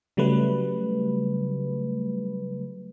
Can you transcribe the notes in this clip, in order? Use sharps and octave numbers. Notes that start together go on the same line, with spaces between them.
C#3 F#3 G3 A3 B4